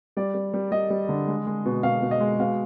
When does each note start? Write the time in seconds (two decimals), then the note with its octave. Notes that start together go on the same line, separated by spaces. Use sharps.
0.17 G3 D5
0.34 G3
0.54 G3
0.72 G3 D#5
0.90 G3
1.09 D3
1.28 G#3
1.47 G#3
1.65 B2
1.83 B2 F5
2.02 B2
2.11 D#5
2.20 G#3
2.40 B2 F5